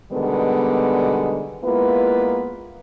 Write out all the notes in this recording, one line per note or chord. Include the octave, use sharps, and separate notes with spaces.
B2 D3 D#3 G3 G#3 B3
G#3 A#3 B3 E4 F4 B4